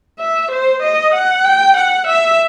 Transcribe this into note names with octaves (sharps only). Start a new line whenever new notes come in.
E5
C5
D#5
F#5
G5
F#5
E5